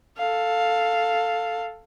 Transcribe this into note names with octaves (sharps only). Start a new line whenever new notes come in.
A4 F5